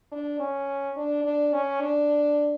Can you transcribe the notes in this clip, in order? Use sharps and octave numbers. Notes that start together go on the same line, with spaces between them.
D4
C#4
D4
D4
C#4
D4